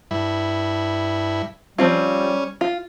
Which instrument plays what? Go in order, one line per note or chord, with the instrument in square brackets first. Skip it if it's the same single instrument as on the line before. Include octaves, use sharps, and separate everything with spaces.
[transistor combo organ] G2 E4
[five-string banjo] F3 C4 F4 [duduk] G3 [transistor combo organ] C#4
[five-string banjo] F4